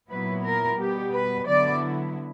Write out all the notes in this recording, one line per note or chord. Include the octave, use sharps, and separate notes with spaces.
A#2 F#3 B3 E4 B4
A#4
B2 G3 B3 G4
B4
D3 F#3 B3 E4 D5